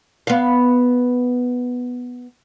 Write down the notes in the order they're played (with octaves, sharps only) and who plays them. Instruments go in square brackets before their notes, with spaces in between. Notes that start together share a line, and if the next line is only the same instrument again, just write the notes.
[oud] B3 F5